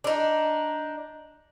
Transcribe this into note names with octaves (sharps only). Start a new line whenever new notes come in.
D4 D#4